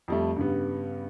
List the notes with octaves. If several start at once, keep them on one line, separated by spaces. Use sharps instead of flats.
F2 G3 A3
G2 C#3 G3 B3